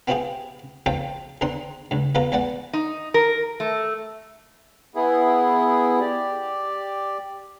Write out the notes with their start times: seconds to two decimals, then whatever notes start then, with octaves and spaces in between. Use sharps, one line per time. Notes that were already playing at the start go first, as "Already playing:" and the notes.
0.07 B3 C4 E4 F4 G4 G#4
0.86 E2 C4 F4 A4 G5
1.41 E2 D3 C4 D#4 C6
1.91 C#2 G2
2.15 E2 A#3 B3 F4 A4 A#4
2.32 E2 G#3 B3 D5 F#5
2.73 D#4
3.14 A#4
3.60 A3
4.95 B3 E4 G#4
6.00 G4 D5